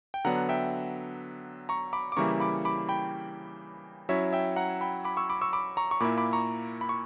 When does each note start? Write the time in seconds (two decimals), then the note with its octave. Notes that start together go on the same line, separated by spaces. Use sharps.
0.14 G5
0.25 D3 F#3 B3 D4 F#5 A#5
0.49 E5 G5
1.69 A#5 C#6
1.93 B5 D6
2.12 D6
2.17 C#3 E3 G3 A#3 E4 A#5 C#6
2.40 B5 D6
2.65 B5 D6
2.89 G5 B5
4.09 F#3 C#4 E4 C#5 E5
4.33 E5 G5
4.56 F#5 A#5
4.81 G5 B5
5.05 B5 D6
5.17 C#6 E6
5.30 B5 D6
5.41 C#6 E6
5.53 B5 D6
5.77 A#5 C#6
5.91 C#6
6.00 A#2 A#3 E4 B5 D6
6.18 B5 D6
6.33 A#5 C#6
6.81 B5
6.89 C#6